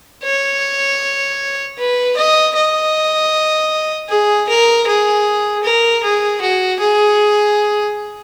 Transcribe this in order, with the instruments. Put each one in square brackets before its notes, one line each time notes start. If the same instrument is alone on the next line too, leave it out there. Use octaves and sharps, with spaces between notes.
[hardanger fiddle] C#5
B4
D#5
D#5
G#4
A#4
G#4
A#4
G#4
F#4
G#4